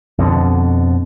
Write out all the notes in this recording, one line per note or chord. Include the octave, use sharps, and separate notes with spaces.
F2 B2 D3